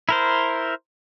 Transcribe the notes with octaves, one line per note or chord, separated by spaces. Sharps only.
E4 A#4 C5